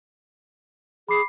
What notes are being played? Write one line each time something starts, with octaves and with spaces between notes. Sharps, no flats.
G#4 B5 D6 C7